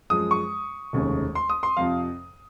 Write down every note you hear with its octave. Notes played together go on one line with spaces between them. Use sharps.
F#2 F3 G#3 D#6
C#6
F1 D#2 C#3 G#3
C6
D#6
C6
F2 C3 F3 F5